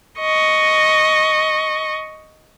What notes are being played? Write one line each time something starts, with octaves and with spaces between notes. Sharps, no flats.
D#5 C#6